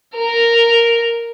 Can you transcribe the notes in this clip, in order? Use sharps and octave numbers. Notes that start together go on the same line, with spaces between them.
A#4